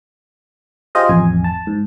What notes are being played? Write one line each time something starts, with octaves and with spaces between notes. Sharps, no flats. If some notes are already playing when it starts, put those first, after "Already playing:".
F4 G4 G#4 C5 D#5 F5
A1 F2 G#5
A5
G#2